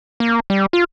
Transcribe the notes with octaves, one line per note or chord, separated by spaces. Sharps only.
A#3
G3
F4